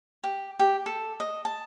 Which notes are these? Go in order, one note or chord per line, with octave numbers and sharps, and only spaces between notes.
G4
G4
A4
D#5
A5